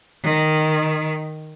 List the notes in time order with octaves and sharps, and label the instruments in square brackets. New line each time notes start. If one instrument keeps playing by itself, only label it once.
[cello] D#3